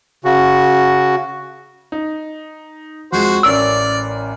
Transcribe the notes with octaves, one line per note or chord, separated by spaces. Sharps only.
C#3 F#4
D#4
F2 G#3 F#4 C5
A1 C#4 A#4 D5 E6 D7